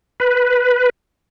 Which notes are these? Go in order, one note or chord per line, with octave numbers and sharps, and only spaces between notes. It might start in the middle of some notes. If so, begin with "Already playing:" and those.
B4